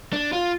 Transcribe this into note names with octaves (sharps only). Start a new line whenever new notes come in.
D4
F4